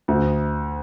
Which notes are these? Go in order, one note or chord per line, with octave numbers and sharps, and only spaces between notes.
D2